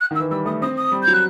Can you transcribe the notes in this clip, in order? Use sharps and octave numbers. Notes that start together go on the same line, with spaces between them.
F#6
D#3
E6
E3
G3 E6
A3 D#6
C4 D#6
D#6
G3
G6
F#3
F#6